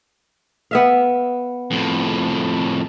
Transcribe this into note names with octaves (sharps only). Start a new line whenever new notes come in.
B3 E5 F5
F2 A2